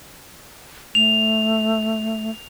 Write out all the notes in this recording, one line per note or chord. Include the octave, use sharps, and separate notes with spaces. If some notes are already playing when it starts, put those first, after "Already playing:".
A3 F7